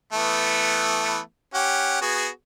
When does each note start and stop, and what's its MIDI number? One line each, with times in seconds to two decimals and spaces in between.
0.13 1.19 52
0.13 1.19 57
0.13 1.19 59
1.54 1.98 61
1.54 1.98 67
1.54 1.98 78
2.01 2.28 59
2.01 2.28 66
2.01 2.28 68